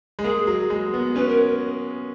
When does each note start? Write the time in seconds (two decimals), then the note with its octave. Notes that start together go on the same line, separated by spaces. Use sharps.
0.19 G#3
0.24 A#3 G#4
0.47 F#3
0.70 G#3
0.94 B3
1.16 C#4 B4
1.28 A#4